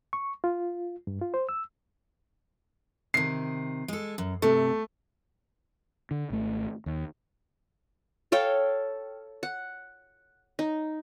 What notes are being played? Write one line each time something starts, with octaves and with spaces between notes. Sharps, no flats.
C#6
F4
G2
F4
C5
E6
C3 D#3 C7
G#3 A4
F#2
G2 C3 A3
D3
G#1 A3
D#2
A4 C#5 F5 G5
F#5
D#4